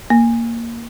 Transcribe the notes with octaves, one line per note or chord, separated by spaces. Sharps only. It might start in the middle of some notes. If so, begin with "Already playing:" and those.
A#3